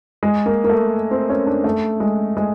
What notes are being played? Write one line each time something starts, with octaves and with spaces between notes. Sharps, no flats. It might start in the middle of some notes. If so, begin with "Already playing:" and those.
G#3
A#3
A#3
A3
C4
C#4
D4
A3
G#3
G#3